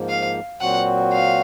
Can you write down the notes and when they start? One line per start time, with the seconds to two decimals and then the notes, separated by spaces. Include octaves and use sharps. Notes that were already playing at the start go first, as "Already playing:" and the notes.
Already playing: G#2 F3 A#3
0.09 F5
0.60 A#2 F#3 C4 F#4 F#5
1.13 F5